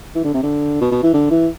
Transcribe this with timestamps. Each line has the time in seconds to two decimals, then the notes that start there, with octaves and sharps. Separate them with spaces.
0.15 E3
0.24 D3
0.34 C3
0.43 D3
0.81 B2
0.91 B2
1.03 E3
1.14 D3
1.30 E3